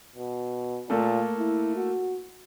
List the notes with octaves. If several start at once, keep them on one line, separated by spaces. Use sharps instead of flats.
B2
A#2 A3 A#3 A4
E4
F#4